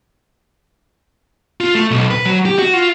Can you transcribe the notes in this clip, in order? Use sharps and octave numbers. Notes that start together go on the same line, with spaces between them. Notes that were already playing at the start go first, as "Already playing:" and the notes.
F4
A3
B1
B4
F#3
G4
F#4
F4